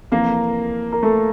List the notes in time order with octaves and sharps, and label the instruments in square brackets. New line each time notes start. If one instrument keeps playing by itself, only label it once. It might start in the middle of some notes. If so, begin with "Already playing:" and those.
[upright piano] F1 F2 E3 A#3 A#4
A#4
A3 A4